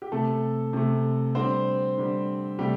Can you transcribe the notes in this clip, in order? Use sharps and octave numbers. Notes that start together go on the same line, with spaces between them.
G4
C3 A3 A4
C3 A3
D3 G3 C4 C5
D3 G3
C3 G3 A3 G4